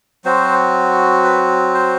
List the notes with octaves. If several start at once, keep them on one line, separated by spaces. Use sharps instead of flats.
F#3 C4 F#4 C5
B4
C5